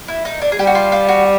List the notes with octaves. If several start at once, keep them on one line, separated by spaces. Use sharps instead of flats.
E4
D#4
D4
G#4
G3 G4
F#4
F4
F4
F#4